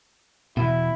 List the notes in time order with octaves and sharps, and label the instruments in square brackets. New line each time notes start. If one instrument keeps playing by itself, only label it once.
[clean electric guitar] E2 B2 [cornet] E4